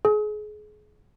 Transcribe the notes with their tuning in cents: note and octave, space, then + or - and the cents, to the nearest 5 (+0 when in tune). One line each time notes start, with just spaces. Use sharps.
G#4 +30